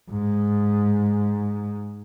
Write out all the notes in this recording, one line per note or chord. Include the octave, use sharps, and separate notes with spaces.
G#2